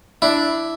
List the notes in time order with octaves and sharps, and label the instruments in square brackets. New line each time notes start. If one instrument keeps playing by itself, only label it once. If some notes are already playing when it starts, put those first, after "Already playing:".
[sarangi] D4 [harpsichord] E4